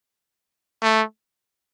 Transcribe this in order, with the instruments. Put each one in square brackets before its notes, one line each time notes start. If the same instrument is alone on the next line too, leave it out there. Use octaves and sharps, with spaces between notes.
[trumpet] A3